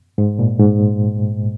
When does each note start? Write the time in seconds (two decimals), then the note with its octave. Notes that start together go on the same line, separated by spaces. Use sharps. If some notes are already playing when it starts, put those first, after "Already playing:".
0.18 G#2
0.39 A#2
0.59 G#2